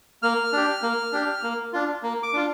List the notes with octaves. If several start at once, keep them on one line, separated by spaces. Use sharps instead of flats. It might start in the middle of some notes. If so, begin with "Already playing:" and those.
A#3 F6
D4 G4
A#3
D4 G4
A#3
D4 F4
A#3
D6
D4 F4